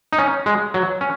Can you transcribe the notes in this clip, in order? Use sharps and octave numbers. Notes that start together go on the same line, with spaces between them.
D#4
C#4
G#3
F#3
C#4